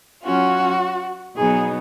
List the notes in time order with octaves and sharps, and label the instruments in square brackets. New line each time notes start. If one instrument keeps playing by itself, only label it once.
[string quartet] F#3 C#4 F4 F#4
B2 F#3 B3 D#4 G#4